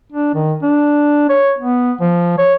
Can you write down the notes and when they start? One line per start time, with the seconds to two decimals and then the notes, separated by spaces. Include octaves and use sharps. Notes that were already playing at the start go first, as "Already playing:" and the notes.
0.12 D4
0.35 D#3
0.63 D4
1.29 C#5
1.59 B3
2.01 F3
2.38 C#5